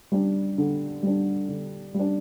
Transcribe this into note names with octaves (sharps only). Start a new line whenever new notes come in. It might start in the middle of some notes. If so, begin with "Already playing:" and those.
G3 D4
D3
G3 D4
D3
G3
D4